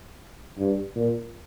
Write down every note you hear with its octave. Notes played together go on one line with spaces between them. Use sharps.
G2
A#2